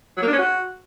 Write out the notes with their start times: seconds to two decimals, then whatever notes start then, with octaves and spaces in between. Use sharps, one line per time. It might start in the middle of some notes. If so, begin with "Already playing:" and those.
0.17 F#3
0.22 A#3
0.28 D4
0.33 C#4
0.38 F#4